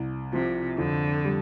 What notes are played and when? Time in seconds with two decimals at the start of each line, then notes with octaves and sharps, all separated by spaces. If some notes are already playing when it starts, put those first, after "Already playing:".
Already playing: C2
0.33 C3 F3
0.78 F2 D3
1.25 G3